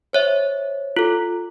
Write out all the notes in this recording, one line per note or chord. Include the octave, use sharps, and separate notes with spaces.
C5 C#5 E5
F4 A4